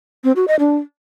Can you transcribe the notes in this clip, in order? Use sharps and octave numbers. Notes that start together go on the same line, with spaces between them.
C4
F#4
D#5
D4